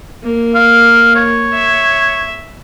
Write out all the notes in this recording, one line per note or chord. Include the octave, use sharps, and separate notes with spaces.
A#3
F5
C#5
E5